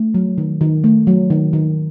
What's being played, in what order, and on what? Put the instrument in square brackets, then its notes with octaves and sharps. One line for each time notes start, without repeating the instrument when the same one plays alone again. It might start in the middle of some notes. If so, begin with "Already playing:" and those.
Already playing: [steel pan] A3
F#3
D#3
D#3
A3
F#3
D#3
D#3